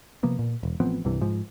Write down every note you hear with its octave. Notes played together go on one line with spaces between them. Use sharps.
C3 F3 A#3 B3
A#2
E1
A1 F3 B3 C4
C2 G2 C3 E3
G#2 F3